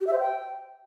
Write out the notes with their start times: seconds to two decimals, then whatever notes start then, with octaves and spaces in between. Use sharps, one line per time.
0.01 G4
0.07 E5
0.13 C5
0.19 G5